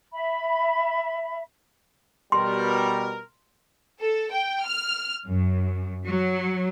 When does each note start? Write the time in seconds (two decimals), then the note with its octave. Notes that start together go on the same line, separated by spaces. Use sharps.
0.12 E5 B5
2.32 B2 G3 A#4 C6
3.99 A4
4.31 G5
4.65 F6
5.28 F#2
6.06 F#3